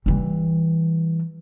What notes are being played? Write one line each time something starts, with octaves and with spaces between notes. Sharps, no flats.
E3 G3